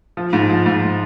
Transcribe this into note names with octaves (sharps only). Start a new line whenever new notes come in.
F3
G#2
F3
G#2